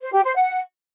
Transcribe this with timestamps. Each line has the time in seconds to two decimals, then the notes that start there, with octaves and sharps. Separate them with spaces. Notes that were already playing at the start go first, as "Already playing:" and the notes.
0.01 C5
0.13 G4
0.24 C5
0.36 F#5